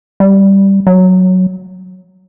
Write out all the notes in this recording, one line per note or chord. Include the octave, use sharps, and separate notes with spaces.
G3
F#3